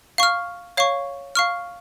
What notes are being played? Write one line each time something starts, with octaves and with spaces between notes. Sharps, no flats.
F5 C#6 F6
C#5 F5 C#6
F5 C#6 F6